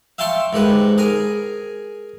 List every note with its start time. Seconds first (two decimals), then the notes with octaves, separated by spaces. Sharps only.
0.18 E5 F5 G5 A5 C6 C#6
0.53 G#2 D#3 G4 B4
0.98 G#4 A#4 G#5